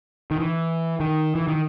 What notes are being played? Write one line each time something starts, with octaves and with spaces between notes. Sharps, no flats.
D#3
E3
D#3
E3
D#3